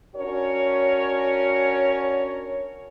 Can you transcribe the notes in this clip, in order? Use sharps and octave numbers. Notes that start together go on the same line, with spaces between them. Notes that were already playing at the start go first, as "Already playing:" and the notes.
C#4 D4 F#4 A#4 C#5